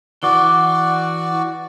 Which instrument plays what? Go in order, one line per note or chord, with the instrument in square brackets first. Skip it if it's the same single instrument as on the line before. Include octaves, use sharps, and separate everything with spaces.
[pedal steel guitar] E3 D6 [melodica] F#4 D5